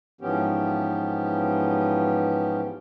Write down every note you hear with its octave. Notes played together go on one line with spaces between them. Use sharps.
G#2 E3 F3 B3 C#4 G4